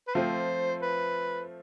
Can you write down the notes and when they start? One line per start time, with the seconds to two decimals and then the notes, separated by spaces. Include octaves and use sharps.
0.08 B4
0.15 F3 A3 C4 F4 C5
0.82 B4